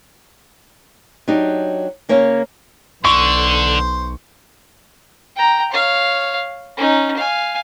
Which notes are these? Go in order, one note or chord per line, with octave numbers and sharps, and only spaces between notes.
F#3 D4 D#4 G4
C#3 A#3 C#4 C#5 F5
B1 D3 C5 C#6
G5 A#5
C#5 F5
C#4 D#4
F5 G#5